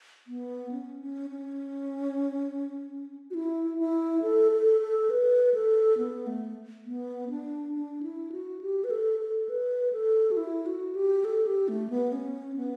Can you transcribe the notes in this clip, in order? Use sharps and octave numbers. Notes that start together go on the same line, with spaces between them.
B3
C#4
C#4
C#4
F#4
E4
E4
A4
A4
A4
B4
A4
B3
A3
B3
D4
D4
E4
F#4
G4
B4
A4
A4
B4
A4
F#4
E4
F#4
G4
A4
G4
A3
B3
C#4
B3